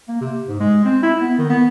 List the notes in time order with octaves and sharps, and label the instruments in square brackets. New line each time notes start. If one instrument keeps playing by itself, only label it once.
[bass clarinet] A#3
C3
G#2
G#3
C4
E4
B3
D#3
B3